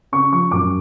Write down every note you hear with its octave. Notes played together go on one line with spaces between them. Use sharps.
C#3 C#6
F3 C#6
F#2 D6